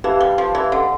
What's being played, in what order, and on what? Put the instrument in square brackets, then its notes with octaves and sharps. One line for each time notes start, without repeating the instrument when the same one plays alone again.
[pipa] E3 [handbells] G4 B4 F5 A5
[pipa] G3
F3
E3
D3